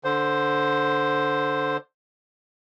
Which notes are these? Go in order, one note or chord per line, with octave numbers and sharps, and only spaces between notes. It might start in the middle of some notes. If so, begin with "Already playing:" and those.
D3 C5